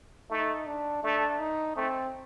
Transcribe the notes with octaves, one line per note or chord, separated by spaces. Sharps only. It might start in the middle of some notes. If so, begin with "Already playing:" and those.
A3 D#4
D4
A3 D4
D#4
A3 C4